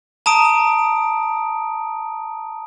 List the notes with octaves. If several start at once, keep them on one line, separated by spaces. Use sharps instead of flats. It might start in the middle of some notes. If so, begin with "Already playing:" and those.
A5 A#5 D#6 D7